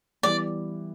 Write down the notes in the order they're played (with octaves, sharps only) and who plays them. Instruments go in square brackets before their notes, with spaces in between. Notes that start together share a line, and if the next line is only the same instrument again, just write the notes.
[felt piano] E3 G3 B3 E4 [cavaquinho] D5